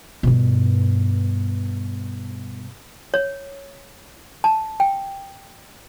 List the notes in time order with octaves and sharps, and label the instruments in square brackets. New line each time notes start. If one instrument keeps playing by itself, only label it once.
[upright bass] G2 B2
[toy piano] C#5
A5
G5